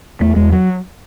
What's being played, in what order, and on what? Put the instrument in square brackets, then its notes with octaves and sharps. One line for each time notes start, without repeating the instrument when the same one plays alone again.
[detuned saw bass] E2 [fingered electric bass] A3
[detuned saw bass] E2 [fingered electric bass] G#3
[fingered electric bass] F#3